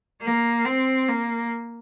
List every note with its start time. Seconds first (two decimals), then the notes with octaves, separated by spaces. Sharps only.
0.22 A#3
0.65 C4
1.09 A#3